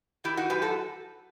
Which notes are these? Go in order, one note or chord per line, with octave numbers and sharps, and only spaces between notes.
D#3 E4 G4
D#4 F#4
F#2 G4 B4
F#4 A4